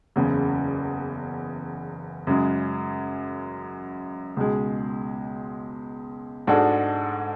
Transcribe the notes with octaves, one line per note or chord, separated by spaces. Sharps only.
F#1 E2 C#3
F#2 C#3 G#3
C#2 B2 G#3
G#2 G#3 D4 F#4 A4